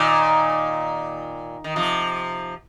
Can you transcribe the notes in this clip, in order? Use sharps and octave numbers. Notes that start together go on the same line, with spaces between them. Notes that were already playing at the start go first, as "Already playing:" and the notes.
Already playing: A#2 D#3
D#3
C3 F3